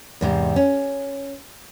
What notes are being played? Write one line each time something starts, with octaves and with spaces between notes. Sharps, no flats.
E2 G#2 C3
C#4